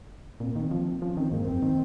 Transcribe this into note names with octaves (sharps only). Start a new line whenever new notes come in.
A#2 C4
A#3
D#3
C4
F3
F3 C#4
D#3 C4
G#2 A#3
F#2 C4
D#3